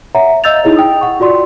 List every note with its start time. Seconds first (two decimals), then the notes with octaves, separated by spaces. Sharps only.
0.15 C#5 E5 F#5 A#5
0.44 D#5 F5 E6 G6 A6 F7
0.63 D#4 E4 G#4 C#5 D#5
0.77 G5 D#6
1.01 F#5 C#6
1.20 F4 F#4 D5 C6